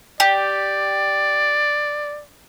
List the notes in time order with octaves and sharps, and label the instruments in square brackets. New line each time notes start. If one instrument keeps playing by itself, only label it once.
[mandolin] G4 [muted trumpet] D5